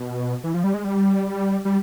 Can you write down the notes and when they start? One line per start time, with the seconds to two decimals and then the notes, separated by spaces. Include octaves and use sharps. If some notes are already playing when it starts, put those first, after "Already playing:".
Already playing: B2
0.44 E3
0.54 F3
0.64 G3
0.74 G#3
0.84 G3
1.65 G3